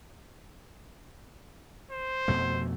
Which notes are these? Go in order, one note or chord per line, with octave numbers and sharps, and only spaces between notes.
C5
F2 B2 A3